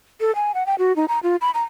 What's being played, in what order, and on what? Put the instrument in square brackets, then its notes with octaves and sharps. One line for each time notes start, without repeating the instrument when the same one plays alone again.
[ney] A4
G#5
F#5
G5
F#4
D#4
A#5
F4
B5
A#5